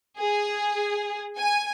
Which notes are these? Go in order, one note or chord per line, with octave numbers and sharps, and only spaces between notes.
G#4
G#5